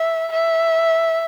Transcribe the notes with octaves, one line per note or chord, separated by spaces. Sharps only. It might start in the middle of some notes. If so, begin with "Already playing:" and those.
Already playing: E5
E5